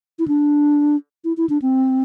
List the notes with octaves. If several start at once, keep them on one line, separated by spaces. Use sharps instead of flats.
E4
D4
E4
E4
D4
C4